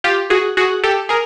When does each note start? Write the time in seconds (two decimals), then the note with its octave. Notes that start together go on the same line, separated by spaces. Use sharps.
0.04 F4 G4
0.30 F#4 G#4
0.57 F#4 G#4
0.83 G4 A4
1.09 G#4 A#4